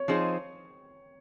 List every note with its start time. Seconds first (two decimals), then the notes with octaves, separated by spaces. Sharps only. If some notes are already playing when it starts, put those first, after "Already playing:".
Already playing: C#5
0.08 F3 C4 D#4 G#4 C5